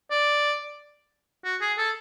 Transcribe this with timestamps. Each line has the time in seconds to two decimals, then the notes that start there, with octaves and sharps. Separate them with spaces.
0.11 D5
1.44 F#4
1.61 G#4
1.78 A4